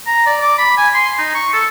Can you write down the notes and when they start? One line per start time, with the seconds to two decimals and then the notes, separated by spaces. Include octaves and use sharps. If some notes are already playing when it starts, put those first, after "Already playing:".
0.07 A#5
0.26 D5
0.42 D6
0.58 B5
0.78 G#5
0.95 C6
1.18 D#4
1.35 C#6
1.53 A4